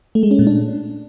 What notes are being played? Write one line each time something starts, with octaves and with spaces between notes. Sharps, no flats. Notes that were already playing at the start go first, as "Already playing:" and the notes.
A3
G#3
C#4
A#2
D4